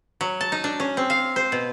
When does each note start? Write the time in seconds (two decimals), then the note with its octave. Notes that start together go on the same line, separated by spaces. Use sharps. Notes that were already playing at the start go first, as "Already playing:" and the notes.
0.21 F#3
0.41 A5
0.52 D#4
0.64 D4
0.80 C#4
0.97 C4
1.10 F5
1.36 C5
1.52 B2